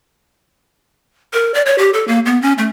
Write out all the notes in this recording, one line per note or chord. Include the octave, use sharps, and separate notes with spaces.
A#4
D5
C#5
G4
A4
A#3
B3
C#4
A3